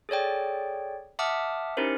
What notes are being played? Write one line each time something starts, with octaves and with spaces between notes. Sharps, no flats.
G#4 A4 C#5 D5 G5
E5 F#5 A5 D6 D#6 F6
C#4 D#4 E4 G4 A#4 C5